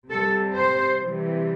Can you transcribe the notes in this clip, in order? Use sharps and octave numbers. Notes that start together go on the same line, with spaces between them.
C3 G3 A4
C5
C3 E3 G3